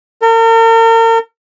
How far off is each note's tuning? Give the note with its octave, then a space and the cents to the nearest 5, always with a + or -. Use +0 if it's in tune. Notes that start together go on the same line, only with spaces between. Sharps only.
A#4 -40